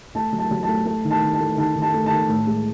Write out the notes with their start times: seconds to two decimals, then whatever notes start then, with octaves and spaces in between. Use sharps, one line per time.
0.15 A3 A5
0.33 F#3
0.38 A5
0.51 F#3
0.63 A5
0.68 A3
0.86 A3 A5
1.04 D#3
1.11 A5
1.22 D#3
1.34 A5
1.40 A3
1.57 D#3 A5
1.75 D#3
1.82 A5
1.94 A3
2.06 D#3 A5
2.29 A2
2.47 G#3